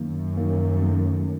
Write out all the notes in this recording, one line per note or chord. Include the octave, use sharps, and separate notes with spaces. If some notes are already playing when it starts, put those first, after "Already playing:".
Already playing: F#2 D#3 F#3 A#3
D#3 F#3 A#3
D#3 F#3 A3 C#4